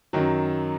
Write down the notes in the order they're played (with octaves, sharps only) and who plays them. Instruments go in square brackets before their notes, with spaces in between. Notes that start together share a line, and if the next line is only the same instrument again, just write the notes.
[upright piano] F#2 D#3 F#3